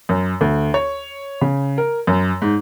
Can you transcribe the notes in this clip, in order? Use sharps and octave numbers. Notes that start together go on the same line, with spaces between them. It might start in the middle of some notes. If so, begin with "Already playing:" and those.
F#2
D2
C#5
C#3
A#4
F#2
G#2